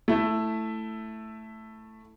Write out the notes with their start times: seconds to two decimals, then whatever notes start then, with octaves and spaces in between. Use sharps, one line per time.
0.08 A3 E4